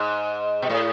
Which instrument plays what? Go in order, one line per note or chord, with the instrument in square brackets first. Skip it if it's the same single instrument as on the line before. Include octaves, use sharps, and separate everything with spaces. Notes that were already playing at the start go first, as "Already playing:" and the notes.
Already playing: [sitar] G#2
B2
A2